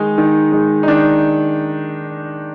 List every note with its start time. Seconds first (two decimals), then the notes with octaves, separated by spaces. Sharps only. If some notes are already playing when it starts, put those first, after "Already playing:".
Already playing: D#3 G#3 D#4
0.18 D#3
0.52 G#3
0.83 D#4
0.88 D#3 D4